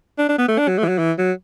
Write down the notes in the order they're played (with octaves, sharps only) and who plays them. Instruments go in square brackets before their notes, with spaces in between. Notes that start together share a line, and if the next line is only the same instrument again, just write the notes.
[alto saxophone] D4
D4
B3
A3
D4
F#3
A3
E3
F#3
E3
F#3